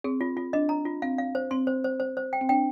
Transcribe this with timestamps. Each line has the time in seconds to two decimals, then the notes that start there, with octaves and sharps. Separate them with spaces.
0.04 C4 G#4
0.21 F4
0.37 F4
0.53 D4 D#5
0.69 A#5
0.85 F4
1.02 C4 F5
1.18 F5
1.35 C5
1.51 C4 C6
1.67 C5
1.84 C5
2.00 C5
2.17 C5
2.33 G5
2.41 C4
2.49 D4 G5